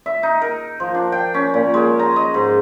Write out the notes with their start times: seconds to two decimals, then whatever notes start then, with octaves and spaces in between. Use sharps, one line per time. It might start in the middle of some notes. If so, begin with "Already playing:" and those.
0.06 E5
0.23 D#4
0.42 A#4
0.80 F3
0.95 D4
1.12 G5
1.34 C#4
1.54 A#2
1.74 G#3
1.99 A#5
2.16 D#5
2.34 G#2